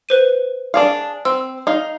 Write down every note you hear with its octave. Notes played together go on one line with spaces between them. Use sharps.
B4 C5 D#7
D4 G#4 F5
C4 E6
D#4 F5